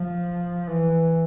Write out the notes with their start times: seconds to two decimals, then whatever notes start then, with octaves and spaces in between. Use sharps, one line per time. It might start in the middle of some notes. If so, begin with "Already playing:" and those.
Already playing: F3
0.67 E3